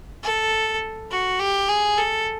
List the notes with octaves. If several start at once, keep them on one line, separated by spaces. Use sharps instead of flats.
A4
F#4
G4
G#4
A4